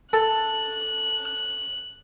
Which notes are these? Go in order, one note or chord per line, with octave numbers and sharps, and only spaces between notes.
A4 F#6